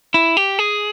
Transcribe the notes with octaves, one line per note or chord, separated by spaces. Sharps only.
E4
G4
G#4